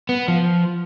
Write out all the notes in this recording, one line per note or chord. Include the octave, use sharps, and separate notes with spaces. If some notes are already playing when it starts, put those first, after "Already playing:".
B3
F3